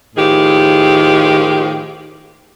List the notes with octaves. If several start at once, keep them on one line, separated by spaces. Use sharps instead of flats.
A2 D#3 F3 G4 G#4